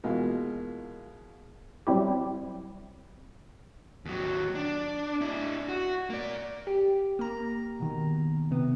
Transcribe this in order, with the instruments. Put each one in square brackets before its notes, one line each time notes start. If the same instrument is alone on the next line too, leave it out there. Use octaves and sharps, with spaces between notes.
[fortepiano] B2 E3 G#3 A#3 F4
[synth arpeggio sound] F#3 G3 C4 E4 G4
[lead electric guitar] D#2 F#3
D4
D4 E4
F#4
A#3 D5
[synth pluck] G4
A#3 A#5
B2 D#3
C3 B3